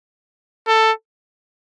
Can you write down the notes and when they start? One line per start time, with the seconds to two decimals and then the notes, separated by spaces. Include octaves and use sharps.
0.67 A4